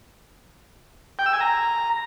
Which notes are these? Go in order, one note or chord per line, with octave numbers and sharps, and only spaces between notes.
G5
E6
G#5
A#5